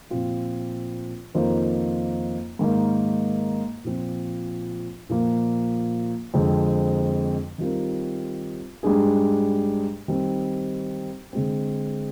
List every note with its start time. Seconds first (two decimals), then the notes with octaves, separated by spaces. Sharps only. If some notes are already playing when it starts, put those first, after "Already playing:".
0.10 A#2 F3 C4 F4
1.35 F2 D#3 A#3 F4 C5
2.59 G#2 D#3 A#3
3.84 A#2 F3 C4 F4
5.09 A#2 F3 A#3
6.34 F2 D3 G#3 C4
7.58 D#3 G3 C4 F4 A#4
8.83 G#2 G3 D4 G#4
10.08 D#3 G3 C4
11.33 D3 G#3 C4